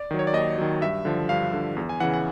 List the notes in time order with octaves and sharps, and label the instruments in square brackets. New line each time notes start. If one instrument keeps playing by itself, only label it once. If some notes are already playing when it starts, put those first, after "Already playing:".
Already playing: [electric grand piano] D5
D#3 F#3
C#5
D5
D#2 D#5
D#3 F#3
G2 E5
D3 F3
G2 F5
D3 F3
E2
G#5
C#3 E3 F#5
F#5